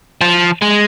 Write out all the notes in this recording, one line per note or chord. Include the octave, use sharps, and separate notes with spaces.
F3
G#3